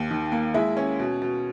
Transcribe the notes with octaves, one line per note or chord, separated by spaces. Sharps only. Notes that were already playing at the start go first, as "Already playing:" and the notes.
Already playing: D#2
D#3
A#3
G#3 E4 E5
C#4
B2
B2